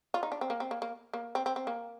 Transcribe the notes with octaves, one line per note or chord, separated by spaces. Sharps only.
F4
D#4
D4
C4
A#3
C4
A#3
A#3
A#3
C4
C4
C4
A#3